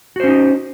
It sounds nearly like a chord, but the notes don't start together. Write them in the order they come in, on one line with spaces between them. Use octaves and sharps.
F#4 C5 C#4 D#4